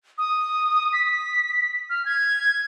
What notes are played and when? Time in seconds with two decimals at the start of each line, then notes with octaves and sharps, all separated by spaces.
0.18 D#6
0.93 B6
1.90 F6
2.05 G#6